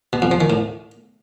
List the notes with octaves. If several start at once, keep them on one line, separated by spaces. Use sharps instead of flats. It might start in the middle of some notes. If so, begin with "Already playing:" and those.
B2
F2
F3
D#3
A2